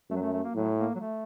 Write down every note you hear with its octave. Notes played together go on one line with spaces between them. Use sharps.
F#2 A3
F#3
A3
A3
A#3
A2 F#3
A#3
F#3
A3